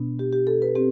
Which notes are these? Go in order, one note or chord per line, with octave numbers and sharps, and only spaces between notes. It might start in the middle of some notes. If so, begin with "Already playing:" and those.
Already playing: B2 B3 D4
G4
G4
A4
B4
C4 G4